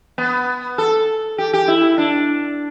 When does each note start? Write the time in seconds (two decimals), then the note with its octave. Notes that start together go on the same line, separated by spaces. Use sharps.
0.18 B3
0.78 A4
1.38 G4
1.53 G4
1.68 E4
1.98 D4